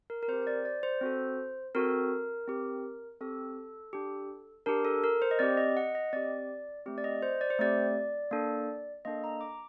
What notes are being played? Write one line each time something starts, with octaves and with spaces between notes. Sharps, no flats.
A#4
A#4
C4 G4 C5
C5
D5
D5
C5
C4 F#4 A4
C4 F#4 A4 A#4
C4 G4
C4 G4 A4
D4 G4
D4 G4 A#4
A4
A#4
C5
D#5
C4 G4 D5
D#5
F#5
D#5
C4 G4 D5
A3 C4 G4
D5
D#5
C5
D5
C5
A3 C4 G4 D5
A#3 D4 A4
A#3 D4 A4 D#5
A#5
D6